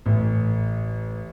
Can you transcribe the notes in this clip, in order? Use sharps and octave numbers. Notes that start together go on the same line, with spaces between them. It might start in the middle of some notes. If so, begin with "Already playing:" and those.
A1